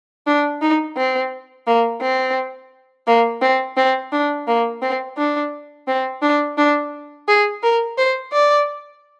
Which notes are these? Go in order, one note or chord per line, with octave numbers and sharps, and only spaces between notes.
D4
D#4
C4
A#3
C4
A#3
C4
C4
D4
A#3
C4
D4
C4
D4
D4
G#4
A#4
C5
D5